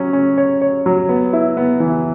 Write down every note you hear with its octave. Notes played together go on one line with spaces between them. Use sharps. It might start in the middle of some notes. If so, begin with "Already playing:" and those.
Already playing: F#3 C#4
C#4
C#5
C#5
F#3
B3
E4
B3
E3